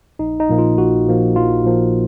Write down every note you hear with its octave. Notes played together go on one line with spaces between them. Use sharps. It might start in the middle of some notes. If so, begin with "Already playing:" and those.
A#1 D#4
D#4
A#2 F3 A#3
F4
A#1 F#4
A#2 F3 A#3
A#1 F4
A#2 F3 A#3